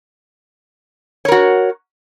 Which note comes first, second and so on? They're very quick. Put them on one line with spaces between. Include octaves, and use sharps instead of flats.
C#5 A#4 F#4